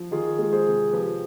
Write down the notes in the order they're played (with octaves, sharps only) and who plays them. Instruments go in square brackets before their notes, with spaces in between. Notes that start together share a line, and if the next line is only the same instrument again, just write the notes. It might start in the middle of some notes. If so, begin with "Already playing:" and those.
Already playing: [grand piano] F3
D#3 F4 G#4
G#3
G#4 C5
C3
F3 G4 B4